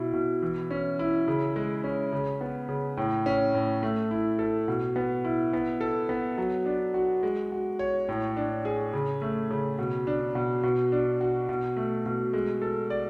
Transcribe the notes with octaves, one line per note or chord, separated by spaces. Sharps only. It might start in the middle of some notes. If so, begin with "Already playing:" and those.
Already playing: B2 E4
B2
E3
C#4
E4
C#3
G#3
C#4
C#3
B3
C#3
A2
C#4
A2
A3
E4
A4
B2
B3
E4
B3
A4
B3
F#3
D4
F#4
G#3
F#4
C#5
A2
D4
G#4
C#3
A3
C#3
B2
D4
B2
B2
D4
F#4
B2
A3
B2
G#3
A4
D5